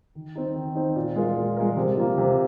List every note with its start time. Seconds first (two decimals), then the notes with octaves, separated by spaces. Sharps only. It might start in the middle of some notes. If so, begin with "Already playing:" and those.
0.15 D#3
0.36 C4 D#4
0.55 D#3
0.75 C4 D#4
0.96 A#2
1.16 G#3 F4 A#4
1.37 A#2
1.56 G#3 F4 A#4
1.77 C3
1.97 F3 A#3
2.18 C3